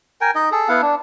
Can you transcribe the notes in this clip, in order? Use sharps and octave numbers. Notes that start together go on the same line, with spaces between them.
A#4 G5 G#5
D#4 D#5
G#4 A4
B3 E4 F5 F#5
D4